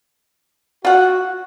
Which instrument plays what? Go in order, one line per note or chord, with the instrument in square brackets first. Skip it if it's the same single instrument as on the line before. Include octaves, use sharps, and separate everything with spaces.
[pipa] F4 F#5 [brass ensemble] F#4